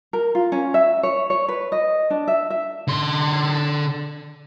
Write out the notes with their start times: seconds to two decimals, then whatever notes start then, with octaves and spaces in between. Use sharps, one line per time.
0.13 A#4
0.35 F4
0.52 C#4
0.74 E5
1.03 C#5
1.30 C#5
1.48 B4
1.72 D#5
2.10 D4
2.28 E5
2.50 E5
2.88 D3 C6